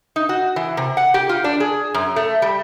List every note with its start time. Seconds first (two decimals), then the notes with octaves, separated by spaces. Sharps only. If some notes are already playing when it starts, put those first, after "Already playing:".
0.16 D#4
0.29 F#4
0.56 E3
0.77 C3
0.97 F#5
1.14 G4
1.29 F4
1.44 D4
1.60 G#4
1.94 F#2
2.16 A3
2.42 G3